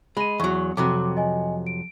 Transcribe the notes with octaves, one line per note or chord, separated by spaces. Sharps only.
G#3 B5 D#7
E2 F#3 C#6
F2 C3 F#3 D6
D#5 G#5
D7